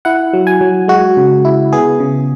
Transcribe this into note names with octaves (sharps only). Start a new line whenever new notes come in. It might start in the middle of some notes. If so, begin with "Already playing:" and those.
E4 F#5
F#3
G#5
F#3
G#3 F#4
C#3
E4
B3 G#4
C#3